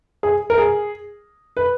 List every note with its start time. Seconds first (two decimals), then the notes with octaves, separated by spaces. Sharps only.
0.23 G#4
0.50 A#4
0.58 G#4
1.57 B4